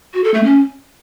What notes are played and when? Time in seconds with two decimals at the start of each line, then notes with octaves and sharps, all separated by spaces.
0.14 F#4
0.24 A4
0.34 A3
0.44 C#4